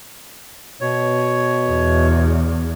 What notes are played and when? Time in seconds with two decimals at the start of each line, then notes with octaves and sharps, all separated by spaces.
0.81 B2 C#5
1.68 E2